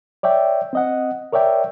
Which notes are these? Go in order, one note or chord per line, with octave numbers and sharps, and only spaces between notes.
C#5 D5 E5 G5
C4 D#5 F#5
A#4 C#5 D5 E5 G5